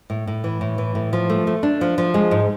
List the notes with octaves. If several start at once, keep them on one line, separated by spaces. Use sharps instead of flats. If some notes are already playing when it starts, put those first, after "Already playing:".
A2
A2
E3
A2
E3
A2
F3
A3
A3
D4
F3
F3
G#3
G#2